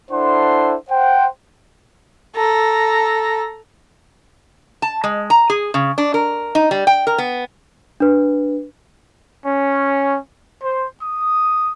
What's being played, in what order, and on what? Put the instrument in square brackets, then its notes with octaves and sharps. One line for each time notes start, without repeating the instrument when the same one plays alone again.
[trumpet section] D4 E4 A4 C5 F#5 C6
C5 F#5 G5
[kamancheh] A4 A#5
[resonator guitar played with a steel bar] A5
G#3
A#5
G#4
C#3
D4
A#4
D#4
G3
G5
A#4
B3
[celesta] D4 B4
[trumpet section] C#4
C5
D#6